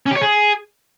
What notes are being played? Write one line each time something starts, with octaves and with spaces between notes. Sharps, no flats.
C#4
G4
C#5
G#4